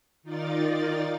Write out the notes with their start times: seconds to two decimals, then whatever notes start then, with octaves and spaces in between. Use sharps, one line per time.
0.23 D#3 D#4 F4 A#4 D5 A6